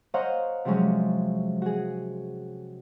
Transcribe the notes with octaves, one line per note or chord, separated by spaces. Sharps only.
C5 C#5 D#5 F5 F#5 A#5
C3 F3 F#3 G#3 C#4
F#4 G#4